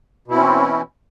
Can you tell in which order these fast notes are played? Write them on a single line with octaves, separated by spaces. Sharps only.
B2 E4 C4 C#4 E3